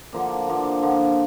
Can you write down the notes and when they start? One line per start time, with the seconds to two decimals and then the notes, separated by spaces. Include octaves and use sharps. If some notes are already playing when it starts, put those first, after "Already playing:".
0.13 D3 F3 A#3 D4
0.48 D3 F3 A#3 D4
0.83 D3 F3 A#3 D4